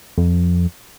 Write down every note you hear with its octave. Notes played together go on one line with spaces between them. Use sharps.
F2